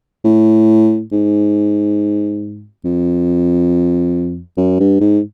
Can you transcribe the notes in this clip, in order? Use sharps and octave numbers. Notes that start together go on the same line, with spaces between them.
A2
G#2
F2
F#2
G2
G#2